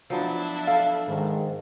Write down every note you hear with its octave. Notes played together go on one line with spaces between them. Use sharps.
F3 F#3 B3 D4 E4
A4 F5
G#2 D#3